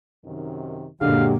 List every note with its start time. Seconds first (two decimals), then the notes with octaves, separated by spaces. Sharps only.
0.25 F#2 C3 D#3
1.01 F#2 A#2 D3 F#3 G#3 A#3 G4 F5